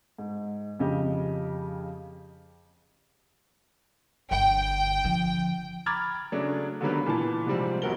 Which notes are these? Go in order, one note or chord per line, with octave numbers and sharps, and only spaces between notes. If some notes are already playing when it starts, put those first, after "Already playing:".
G#2
F2 C#3 G4 D#5
G1 D3 G5
D3 F3
A#5 B5 D6 F6 G#6 A6
C#3 F#3 A3 D4
D3 D#3 F#3 G3 A#3 B3
A#2 E3 B3 A5
G#2 C3 F3 G3 C4
E1 A#1 F#4 A#4 G7